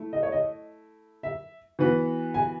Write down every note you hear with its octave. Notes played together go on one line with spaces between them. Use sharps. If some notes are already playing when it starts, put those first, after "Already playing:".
Already playing: A3 E4
D#5
C#5
D#5
E5
E3 B3 F#4 B4
G#5